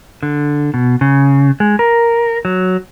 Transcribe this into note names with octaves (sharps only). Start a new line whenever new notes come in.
D3
B2
C#3
G#3
A#4
F#3